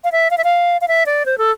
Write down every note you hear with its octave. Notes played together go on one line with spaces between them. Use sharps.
F5
E5
F5
E5
F5
F5
E5
D5
C5
A4